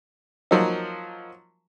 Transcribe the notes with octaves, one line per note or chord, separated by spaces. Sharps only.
F3 F#3 A#3 D#4